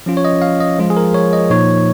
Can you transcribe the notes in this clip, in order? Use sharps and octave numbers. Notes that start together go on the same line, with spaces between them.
F3 C#4 F4
C#5
D#5
F5
D#5
F3 G#3 F4
G#4
A#4
C#5
D#5
A#2 F3 A#3 D#4 C#5